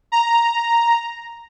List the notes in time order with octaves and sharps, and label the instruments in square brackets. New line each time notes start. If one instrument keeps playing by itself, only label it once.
[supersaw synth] A#5